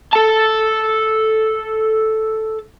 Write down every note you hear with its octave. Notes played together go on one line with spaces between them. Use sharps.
A4 A5